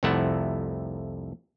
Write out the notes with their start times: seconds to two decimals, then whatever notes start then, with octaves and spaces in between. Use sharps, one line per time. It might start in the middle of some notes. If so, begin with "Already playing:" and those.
0.03 C2 F2 C3 A3 E4 F#5